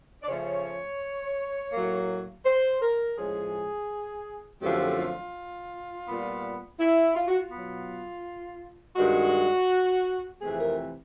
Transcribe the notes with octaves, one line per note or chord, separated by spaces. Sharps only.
D5
C#3 F3 A3 C#4 C#5
A2 F#3 A#3
C5
A#4
A2 F3 G#3 C#4 G#4
F#2 D3 F3 A3 C4 G4
F4
A#2 G3 B3
E4
F4
F#4
F4
B2 F#3 B3
G2 D#3 G#3 F#4
F2 C3 E3 A3 C4 G#4
A#4